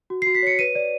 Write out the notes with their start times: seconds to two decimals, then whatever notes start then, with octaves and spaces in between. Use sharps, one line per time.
0.10 F#4
0.22 C7
0.27 F#4
0.35 B6
0.43 C#5 C#7
0.59 B4 D#7
0.75 D5